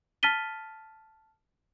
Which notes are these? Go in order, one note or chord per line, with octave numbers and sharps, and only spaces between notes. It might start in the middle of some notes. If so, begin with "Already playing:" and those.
A5 F6 A6 B6 D#7 G7